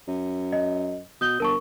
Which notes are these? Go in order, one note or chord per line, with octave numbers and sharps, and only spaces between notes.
F#2
D#5
B2 D#6 G6 G7
G1 A#4 A5 C#6